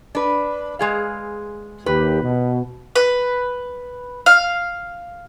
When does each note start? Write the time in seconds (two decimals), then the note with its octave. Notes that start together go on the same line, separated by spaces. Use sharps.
0.15 D4 B4
0.79 G#3 G#4 F5
1.86 D#2 G4 B4
2.22 B2
2.96 B4
4.26 F5